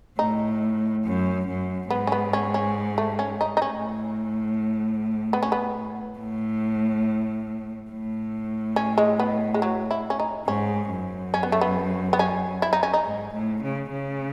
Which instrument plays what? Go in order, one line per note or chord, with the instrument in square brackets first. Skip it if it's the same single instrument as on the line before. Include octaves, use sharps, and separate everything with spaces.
[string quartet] A2 [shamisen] D#4
[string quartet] F#2
F#2
[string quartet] G#2 [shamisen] B3
[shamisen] C#4
B3
C#4
C#4
A3
C#4
D#4
D#4
[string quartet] A2 [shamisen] C#4
[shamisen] B3
C#4
B3
[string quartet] A2
A2
[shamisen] C#4
G#3
B3
G#3
F#3
E4
C#4
D#4
[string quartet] G#2 [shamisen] C#4
[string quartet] F#2
[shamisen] C#4
B3
A3
B3
B3
C#4
E4
D#4
C#4
D#4
[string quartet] G#2
A2
C#3
C#3